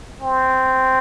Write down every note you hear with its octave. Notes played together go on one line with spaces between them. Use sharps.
C4